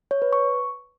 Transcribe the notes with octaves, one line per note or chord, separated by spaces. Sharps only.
C#5
B4
C#6